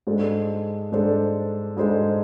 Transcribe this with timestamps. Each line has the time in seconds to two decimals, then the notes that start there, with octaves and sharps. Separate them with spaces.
0.07 G#2 G#3 D4 A4 C5
0.92 G#2 G#3 D4 A4 C5
1.77 G#2 G#3 D4 A4 C5